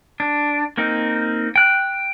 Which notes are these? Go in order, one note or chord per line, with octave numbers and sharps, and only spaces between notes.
D4
A#3 C4 D#4
G5 F#6